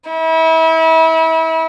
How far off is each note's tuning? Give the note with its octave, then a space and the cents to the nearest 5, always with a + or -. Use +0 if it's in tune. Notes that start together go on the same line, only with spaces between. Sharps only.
E4 -30